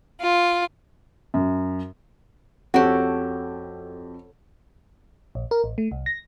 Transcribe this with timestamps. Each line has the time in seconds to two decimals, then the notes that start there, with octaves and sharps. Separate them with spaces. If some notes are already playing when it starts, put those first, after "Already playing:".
0.21 F4
1.34 F#2
2.74 F2 F#4 G4 A4 C#5 F#5
5.35 A#1
5.51 A#4
5.64 A1
5.78 A3
5.91 C2
6.06 A#6